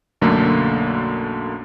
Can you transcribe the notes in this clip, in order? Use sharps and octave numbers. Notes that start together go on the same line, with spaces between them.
B1 F#2 D3 A3 A#3